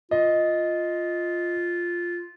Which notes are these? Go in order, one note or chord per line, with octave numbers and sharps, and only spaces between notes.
F4 D#5